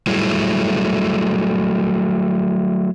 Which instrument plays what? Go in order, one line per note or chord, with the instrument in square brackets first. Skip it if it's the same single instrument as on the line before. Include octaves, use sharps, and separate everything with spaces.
[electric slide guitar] F#3 G3 A3 E4 G#4